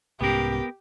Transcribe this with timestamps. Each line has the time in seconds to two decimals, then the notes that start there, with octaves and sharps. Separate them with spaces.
0.21 C2 G#2 B3 C#4 G4 A#4